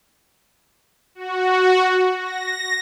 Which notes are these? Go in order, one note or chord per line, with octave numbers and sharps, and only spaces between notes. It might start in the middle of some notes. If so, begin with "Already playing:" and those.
F#4
A#6